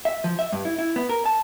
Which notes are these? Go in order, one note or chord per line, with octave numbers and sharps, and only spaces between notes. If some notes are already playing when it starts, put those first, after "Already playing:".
E5
F3
E5
G2
E4
E4
B3
A#4
A5